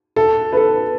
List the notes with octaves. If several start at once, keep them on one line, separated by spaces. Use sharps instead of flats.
A4
B4
A4